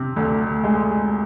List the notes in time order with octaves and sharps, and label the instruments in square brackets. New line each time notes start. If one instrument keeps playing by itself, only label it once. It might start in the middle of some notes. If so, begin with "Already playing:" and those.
Already playing: [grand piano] C3
D2
G#3